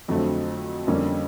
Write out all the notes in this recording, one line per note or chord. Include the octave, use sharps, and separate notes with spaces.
F2 D3 F#3 A3 C4
F2 D3 G3 A#3 C#4